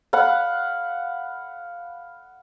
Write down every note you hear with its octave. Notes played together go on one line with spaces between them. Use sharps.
F5 F#5 B5